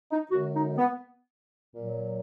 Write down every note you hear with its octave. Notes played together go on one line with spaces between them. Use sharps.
D#4
F#2 D3 G#3 F#4
D#4
B3
A#2 F#3